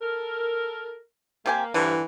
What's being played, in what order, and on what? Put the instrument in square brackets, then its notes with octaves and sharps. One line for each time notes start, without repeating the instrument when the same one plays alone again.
[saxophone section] A4 A#4
[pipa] C3 G4 G#5 [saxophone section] A#3
[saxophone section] G2 C4 E4 [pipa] D3 [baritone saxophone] E3